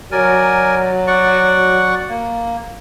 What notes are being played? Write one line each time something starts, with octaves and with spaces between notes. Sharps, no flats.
F#3 A#4 D5 G#5
D5 F#5 C#6
A#3